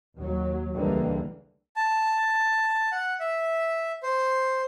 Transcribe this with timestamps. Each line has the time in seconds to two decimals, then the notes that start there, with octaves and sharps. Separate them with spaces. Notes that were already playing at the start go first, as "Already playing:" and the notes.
0.18 D#2 F#3
0.74 C#2 D3 E3 G3 G#3 A#3
1.76 A5
2.92 F#5
3.20 E5
4.03 C5